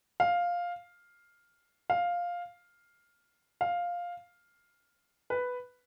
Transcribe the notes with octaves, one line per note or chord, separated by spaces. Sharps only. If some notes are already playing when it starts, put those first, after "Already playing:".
F5
F5
F5
B4